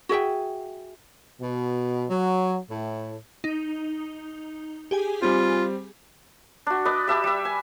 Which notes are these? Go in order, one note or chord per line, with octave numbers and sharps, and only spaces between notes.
F#4 G#4 E5 G5
B2
F#3
A2
D#4
G4 G#4 G#5
G3 C4 F4
D4 F#4
B4 D5 D#5
G4 E5 A5
G3 E5
G#5